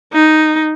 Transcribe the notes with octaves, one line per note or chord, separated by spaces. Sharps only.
D#4